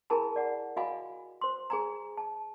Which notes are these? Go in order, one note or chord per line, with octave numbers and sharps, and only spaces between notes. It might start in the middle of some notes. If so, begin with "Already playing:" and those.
E4 G#4 A#4 G#5 A5 B5
D5 F#5
F#4 D#5 F5 G#5 B5
C5 C6
G#4 G#5 A#5
A5